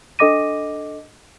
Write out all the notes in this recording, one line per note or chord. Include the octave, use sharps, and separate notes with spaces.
D4 A4 D#5 D6 A#6 D#7